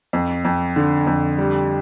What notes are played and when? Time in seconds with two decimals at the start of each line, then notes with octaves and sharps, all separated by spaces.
0.13 F2
0.45 F2
0.76 D3
1.07 F2
1.38 G3